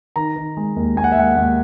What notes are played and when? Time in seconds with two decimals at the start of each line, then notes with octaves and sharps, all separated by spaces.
0.16 D#3 A#5
0.36 D#3
0.57 G#3
0.76 D#2
0.96 D#2 G#5
1.04 F#5
1.12 E5
1.17 G#3 F#5
1.37 D#2